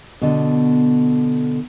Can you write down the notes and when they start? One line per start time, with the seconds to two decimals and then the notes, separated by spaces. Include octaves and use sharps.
0.22 B2 D3